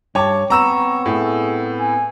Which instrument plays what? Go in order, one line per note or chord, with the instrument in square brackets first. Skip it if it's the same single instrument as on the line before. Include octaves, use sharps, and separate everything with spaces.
[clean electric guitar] G2 G4 [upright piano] C#5 A5
[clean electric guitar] B3 C4 [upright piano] A#5 E6 E7 [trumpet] C#6
[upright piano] A2 [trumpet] G#4
[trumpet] G#5